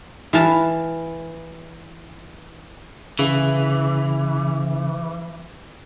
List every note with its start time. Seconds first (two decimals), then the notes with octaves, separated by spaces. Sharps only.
0.33 E3 F5 A5
3.19 C#3 E3